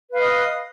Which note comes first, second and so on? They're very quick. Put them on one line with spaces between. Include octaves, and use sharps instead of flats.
B4 F5 D#5 D#6